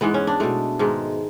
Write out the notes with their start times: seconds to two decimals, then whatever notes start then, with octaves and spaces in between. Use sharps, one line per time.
0.01 G#2 E3 G#3 B3
0.14 C#4
0.27 D4
0.40 B2 G#3 A3
0.79 G#2 D#3 G#3